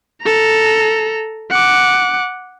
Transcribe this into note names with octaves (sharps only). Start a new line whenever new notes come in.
A4 A#5
F#5 D6